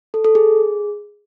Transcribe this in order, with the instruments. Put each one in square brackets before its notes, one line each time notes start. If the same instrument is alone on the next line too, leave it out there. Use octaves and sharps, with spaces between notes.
[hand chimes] A4
A4
G#4